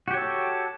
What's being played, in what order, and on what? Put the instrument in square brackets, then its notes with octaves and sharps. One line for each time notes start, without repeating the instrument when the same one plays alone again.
[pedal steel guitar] F#4
G4
C#5
A4